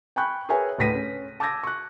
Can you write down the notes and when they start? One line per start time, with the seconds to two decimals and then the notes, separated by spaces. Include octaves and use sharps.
0.16 G5 G#5 B5 C#6 F#6 G6
0.49 G#4 A#4 B4 C#5 E5 G#5
0.78 D2 A2 B4 A#6 B6 D#7
0.94 C#4
1.40 A5 D6 E6 G6 G#6 A#6
1.63 C#6 F#6